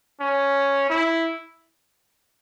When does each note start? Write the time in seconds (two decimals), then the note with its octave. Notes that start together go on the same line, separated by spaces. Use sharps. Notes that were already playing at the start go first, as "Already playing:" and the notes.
0.21 C#4
0.90 E4